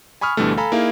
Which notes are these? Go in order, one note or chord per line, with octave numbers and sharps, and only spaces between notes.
G#5 B5 C#6 D#6 F6
D2 B2 D3 E3 G3 A3
A4 F5 G#5 A#5 B5
A#3 D#4 E4 G#4 F5